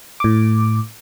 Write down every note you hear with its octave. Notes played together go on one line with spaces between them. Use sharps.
A2 D6